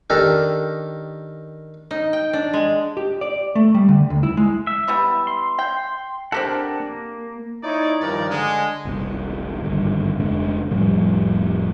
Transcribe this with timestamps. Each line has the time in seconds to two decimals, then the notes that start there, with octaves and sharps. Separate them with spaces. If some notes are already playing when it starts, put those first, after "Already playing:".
0.10 D#3 D4 G4 A4 A#4
1.91 D#4
2.13 G5
2.33 D4
2.53 G#3
2.97 G4
3.21 D5
3.55 A3
3.74 G3
3.89 D3
4.10 D2
4.23 E4
4.37 G#3
4.67 E5
4.88 E3 G3 B3
5.27 C6
5.59 G5
6.32 C4 D4 G4 A4 A#4 F#5
6.80 A#3
7.64 D#4 E4 C#5 D5
8.01 G2 D#3 F3 A#4 D5
8.30 D3 G#3
8.85 F#1 C2
9.63 G#1 D2 G2
10.20 F1 C#3 G#3 D4
10.71 F1 A2 F3 G3